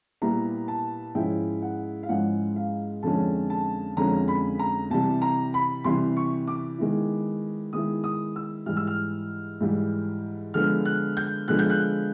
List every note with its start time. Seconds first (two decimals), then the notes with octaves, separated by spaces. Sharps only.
0.22 A#2 G3 B3 E4 A#5
0.68 A5
1.15 G#2 F3 G#3 C#4 E4 G5
1.62 F#5
2.03 F5
2.09 G#2 F3 G#3 C#4 E4 F#5
2.56 F5
3.03 F2 D3 F3 G#3 C#4 A5
3.50 A5
3.97 F2 D3 F3 G#3 C#4 A#5
4.28 B5
4.59 A#5
4.90 C3 E3 G3 A5
5.22 A#5
5.54 B5
5.84 C3 E3 G3 C6
6.17 C#6
6.48 D6
6.78 D#3 G#3 B3 E4
7.73 D#3 G#3 B3 E4 D#6
8.04 D#6
8.36 E6
8.66 G#2 E3 G3 F6
8.77 E6
8.87 F6
9.61 G#2 E3 G3
10.54 D3 F3 G#3 B3 F6
10.85 F#6
11.17 G6
11.48 D3 F3 G#3 B3 F#6
11.59 G6
11.70 F#6